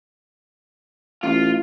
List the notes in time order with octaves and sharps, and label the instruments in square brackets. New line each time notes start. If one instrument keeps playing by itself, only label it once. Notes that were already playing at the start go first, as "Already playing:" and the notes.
[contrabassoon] A1 [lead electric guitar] F4